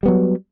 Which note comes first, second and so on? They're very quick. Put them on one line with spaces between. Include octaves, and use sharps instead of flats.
G3 B3 F#3